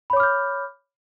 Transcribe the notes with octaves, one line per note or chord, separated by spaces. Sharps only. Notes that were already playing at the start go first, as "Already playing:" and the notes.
C#5 B5 D6 F6 G6